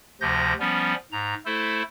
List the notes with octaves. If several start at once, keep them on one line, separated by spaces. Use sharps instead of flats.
D2 C3 F3 G6 A#6
F3 G3 B3 C#4
G#2 A#5
A3 E4 A4 C5